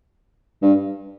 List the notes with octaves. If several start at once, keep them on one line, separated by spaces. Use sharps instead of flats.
G2